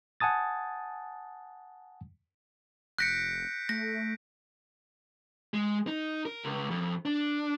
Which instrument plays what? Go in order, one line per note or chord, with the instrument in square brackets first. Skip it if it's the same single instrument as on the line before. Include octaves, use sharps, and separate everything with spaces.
[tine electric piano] F#5 G#5 A5 D#6 A6
[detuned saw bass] F1 [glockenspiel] F#6 A#6 C#7 [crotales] G6 B6 D7
[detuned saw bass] A3 [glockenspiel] A#6
[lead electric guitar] G#3
D#4
A#4
C#2
F2
D4